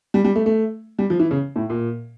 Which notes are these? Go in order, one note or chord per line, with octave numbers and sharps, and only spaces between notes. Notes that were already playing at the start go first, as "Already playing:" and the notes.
G3
G3
A3
A3
G3
F3
E3
C#3
A2
A#2